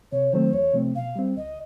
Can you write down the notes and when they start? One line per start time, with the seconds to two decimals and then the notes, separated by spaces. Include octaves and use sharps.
0.12 C3 C#5
0.32 D#3 F#3 A3 C4 C5
0.53 E2 C#5
0.74 C3 F3 A3 C4
0.95 B2 F5
1.16 G3 C4
1.37 C#2 D#5